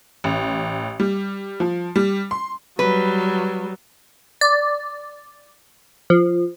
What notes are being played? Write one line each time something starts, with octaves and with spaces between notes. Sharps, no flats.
A1
G3
F3
G3
C6
F#3 G3 B4
D5
F3